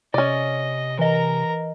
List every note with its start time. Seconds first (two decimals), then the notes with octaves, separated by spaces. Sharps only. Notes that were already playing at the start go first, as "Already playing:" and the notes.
0.14 C3 C#4 D5 D#5
0.99 E3 A#4 D#5 A#5